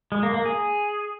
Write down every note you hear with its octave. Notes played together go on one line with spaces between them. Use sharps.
G#3
A#3
A#3
G#4